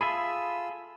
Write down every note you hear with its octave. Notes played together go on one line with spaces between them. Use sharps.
F4 G#4 A4 E5 B5 E6